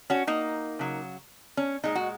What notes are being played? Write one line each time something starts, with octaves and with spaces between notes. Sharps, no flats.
C#4 F#4
A#3 D#4
C#3 F#3
C#4
A#2 G#3 D#4
F#4